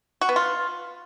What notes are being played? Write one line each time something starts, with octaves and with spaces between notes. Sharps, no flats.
F#4
B3
F4